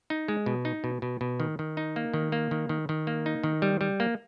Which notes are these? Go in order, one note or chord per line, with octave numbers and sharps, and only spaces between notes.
D#4
G#3
B2
D#4
B2
B2
B2
D#3
D#3
D#4
A#3
D#3
A#3
D#3
D#3
D#3
A#3
D#4
D#3
G3
G3
A#3